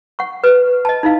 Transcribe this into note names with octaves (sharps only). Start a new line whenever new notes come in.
F#5 C#6
B4
D#5 A5
D#4 E4 F5